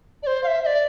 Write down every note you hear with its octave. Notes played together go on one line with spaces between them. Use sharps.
D5
C5
F5
E5
E5
D5